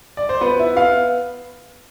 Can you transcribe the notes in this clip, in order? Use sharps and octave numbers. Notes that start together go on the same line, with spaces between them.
D5
C5
B3 B4
E4
B3 F5